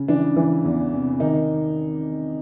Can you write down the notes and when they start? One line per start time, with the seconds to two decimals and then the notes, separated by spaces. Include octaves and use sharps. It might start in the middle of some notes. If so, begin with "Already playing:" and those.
Already playing: C#3
0.08 E3 D4
0.36 E3
0.65 E2
0.92 C3
1.20 D#3 D#4